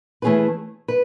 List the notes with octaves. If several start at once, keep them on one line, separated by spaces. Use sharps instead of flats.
E3 A3 C#4 G#4 B4
B4